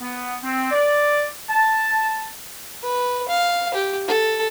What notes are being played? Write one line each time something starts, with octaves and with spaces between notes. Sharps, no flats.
B3
C4
D5
A5
B4
F5
G4
A4